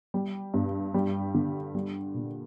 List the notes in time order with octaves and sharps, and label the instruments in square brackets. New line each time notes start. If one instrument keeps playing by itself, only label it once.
[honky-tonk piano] G3
G2
G3
D3
G3
A#2